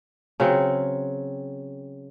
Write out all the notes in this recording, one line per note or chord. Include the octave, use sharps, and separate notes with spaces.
C#3 F#3 C4